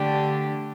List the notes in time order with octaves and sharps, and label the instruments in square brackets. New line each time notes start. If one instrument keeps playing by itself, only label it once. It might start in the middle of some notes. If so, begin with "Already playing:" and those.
Already playing: [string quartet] D3 A3 D4 G4